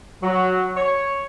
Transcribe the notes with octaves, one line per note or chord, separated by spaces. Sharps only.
F#3
C#5